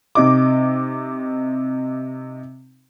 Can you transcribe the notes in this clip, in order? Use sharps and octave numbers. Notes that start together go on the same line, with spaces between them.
C3 D#4 D6